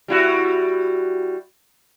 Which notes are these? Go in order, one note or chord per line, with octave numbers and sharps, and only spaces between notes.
G3 E4 F#4